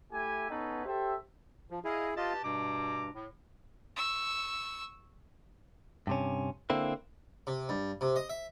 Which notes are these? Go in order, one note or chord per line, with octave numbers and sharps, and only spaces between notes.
A3 E4 G4 G#5
B3 C#4 D#4 A4 B4
G4 A4 C5 E5
F3
E4 G#4 D#5 F5
F4 G4 B4 D#5 A5
G2 B2 A#5 D6
A2
C#6 E6
G2 C3 C#4
D3 A#3 C4 E4
C3
G2
C3
D#5
E5